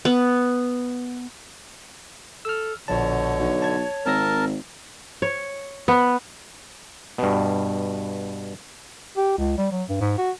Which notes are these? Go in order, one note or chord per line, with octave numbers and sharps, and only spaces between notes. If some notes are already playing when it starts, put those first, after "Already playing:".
B3
A4 E6 F6
A#1 B2 D3 F3 C#5 A5
B1
A5 G#6
G#1 C4 A#4 A5 E6 A#6
C#5
B3
G2 B2
G4
C#2
G3
F#3
G2
G#2
F#4